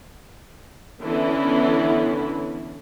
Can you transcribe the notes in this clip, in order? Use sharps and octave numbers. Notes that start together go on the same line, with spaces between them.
D3 E3 B3 C#4 E4